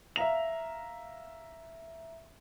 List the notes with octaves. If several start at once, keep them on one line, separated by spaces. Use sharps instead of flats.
E5 F5 A#5 F7